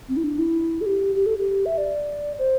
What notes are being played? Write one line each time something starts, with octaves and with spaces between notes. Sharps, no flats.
C4
E4
D4
E4
A4
G4
G4
A4
G4
E5
D5
C5